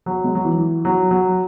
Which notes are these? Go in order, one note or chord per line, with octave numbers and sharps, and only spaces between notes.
F#3
G#3
F#3
E3
F#3
F#3